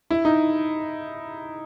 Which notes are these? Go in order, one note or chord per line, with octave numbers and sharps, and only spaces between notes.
E4
D#4